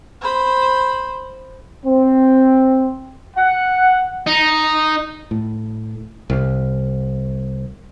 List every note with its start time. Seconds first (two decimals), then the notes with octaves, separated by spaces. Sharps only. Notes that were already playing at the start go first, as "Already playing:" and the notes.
0.21 C5 B5
1.86 C4
3.36 F#5
4.27 D#4
5.31 A2
6.30 C2